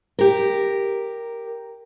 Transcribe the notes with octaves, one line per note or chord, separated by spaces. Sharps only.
G4 A#4